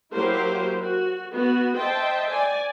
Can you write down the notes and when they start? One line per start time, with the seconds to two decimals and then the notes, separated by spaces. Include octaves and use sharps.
0.13 F#3 A#3 E4 G4 A#4 C5
0.80 F#4
1.31 B3 F#4
1.75 C5 D#5 E5 G5 A5
2.29 D5 G#5